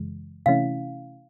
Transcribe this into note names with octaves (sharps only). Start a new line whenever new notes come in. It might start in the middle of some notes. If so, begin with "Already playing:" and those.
Already playing: F#2 C#3 E3 G#3
C3 E3 A3 C#4 E4 F5